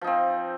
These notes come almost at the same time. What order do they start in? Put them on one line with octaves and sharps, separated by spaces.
F3 D#4 C4